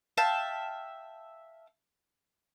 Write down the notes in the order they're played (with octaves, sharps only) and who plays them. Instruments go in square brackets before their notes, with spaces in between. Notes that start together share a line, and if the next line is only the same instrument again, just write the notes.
[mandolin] E5 F5 G5 A5